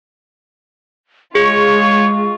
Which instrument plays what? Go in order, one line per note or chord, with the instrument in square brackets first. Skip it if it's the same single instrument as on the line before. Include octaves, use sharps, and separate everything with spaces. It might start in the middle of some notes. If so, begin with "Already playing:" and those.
[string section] G#3 F4 [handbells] G#4 [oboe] C#5 [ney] C#6